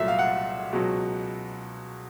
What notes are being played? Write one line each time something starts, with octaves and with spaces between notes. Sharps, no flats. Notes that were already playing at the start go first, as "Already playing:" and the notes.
Already playing: C2 A#2 F#3 A3 E5
F5
F#5
C#2 B2 F#3